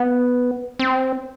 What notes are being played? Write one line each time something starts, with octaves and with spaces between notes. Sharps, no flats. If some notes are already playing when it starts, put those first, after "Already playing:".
Already playing: B3
C4